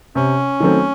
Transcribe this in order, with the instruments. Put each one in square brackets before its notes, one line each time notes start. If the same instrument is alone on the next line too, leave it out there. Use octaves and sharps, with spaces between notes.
[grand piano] C3 [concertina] C#4
[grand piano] D#3 F#3 A3 C4